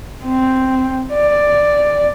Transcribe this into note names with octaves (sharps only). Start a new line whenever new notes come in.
C4
D5